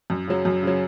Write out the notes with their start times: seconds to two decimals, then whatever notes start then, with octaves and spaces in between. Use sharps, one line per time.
0.10 F#2
0.28 C#3 F#3
0.45 F#2
0.63 C#3 F#3